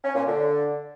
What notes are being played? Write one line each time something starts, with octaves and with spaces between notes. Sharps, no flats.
C#4
A#2
D3